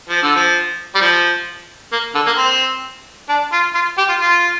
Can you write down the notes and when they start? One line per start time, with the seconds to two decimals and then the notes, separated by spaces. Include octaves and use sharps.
0.09 F3
0.23 D3
0.36 F3
0.95 G3
1.01 F3
1.93 A#3
2.15 D3
2.27 A#3
2.38 C4
3.29 D4
3.52 F4
3.75 F4
3.98 G4
4.09 F4
4.21 F4